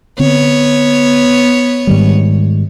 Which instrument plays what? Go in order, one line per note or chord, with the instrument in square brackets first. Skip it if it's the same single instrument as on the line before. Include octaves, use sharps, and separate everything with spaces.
[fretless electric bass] D3 C4 [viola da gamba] B3 C#5
[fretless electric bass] G#2 D#3 G3